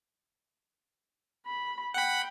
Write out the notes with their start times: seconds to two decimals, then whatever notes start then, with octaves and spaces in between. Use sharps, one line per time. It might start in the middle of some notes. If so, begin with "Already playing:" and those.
1.46 B5
1.94 F#5 G5 B5